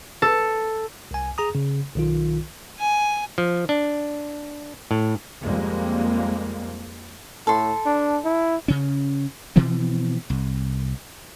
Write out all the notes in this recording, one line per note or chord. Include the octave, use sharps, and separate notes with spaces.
A4
C2 G#5
G#4 A#5 D#6
C#3
B1 D#3 F4
G#5
F3
D4
A2
F2 G3 G#3 A#3
A2 A4 C6
D4
E4
C#3 C#4
B2 E3 F3 C4
C2